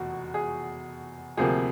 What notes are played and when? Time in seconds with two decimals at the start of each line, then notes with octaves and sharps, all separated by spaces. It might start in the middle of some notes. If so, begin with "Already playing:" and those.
Already playing: F1 E2 B2 F#4
0.34 G#4
1.37 D2 C3 F3 A#3 G#4